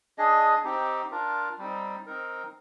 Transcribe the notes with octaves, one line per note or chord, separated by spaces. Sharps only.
D4 G#4 D#5
C4 D#4 G4
D4 F4 A#4
G3 C4 D#4
C4 D#4 A#4